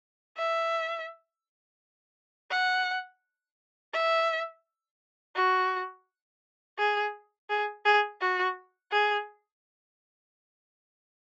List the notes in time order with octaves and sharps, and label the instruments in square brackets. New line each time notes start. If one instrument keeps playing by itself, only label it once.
[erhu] E5
F#5
E5
F#4
G#4
G#4
G#4
F#4
G#4